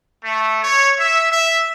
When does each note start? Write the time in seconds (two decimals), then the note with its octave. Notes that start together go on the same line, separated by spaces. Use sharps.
0.23 A3
0.63 C#5
0.98 E5
1.32 E5